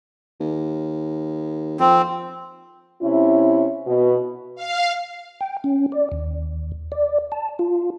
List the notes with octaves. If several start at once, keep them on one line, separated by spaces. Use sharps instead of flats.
D#2
F2 C4
C3 C#4 E4
B2
F5
G5
C#4
D5
D#2
D5
A5
F4